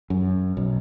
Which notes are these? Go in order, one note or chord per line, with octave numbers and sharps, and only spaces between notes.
F#2
B1